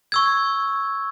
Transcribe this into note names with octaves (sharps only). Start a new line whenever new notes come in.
C#6 E6 G#6